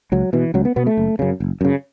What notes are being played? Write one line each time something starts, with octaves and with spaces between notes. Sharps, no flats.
C#2 F#3
B2 E3
C#2 F#3
B3
B2 B3
A3
F#1
F#2 C#3
F#1
F#2 C#3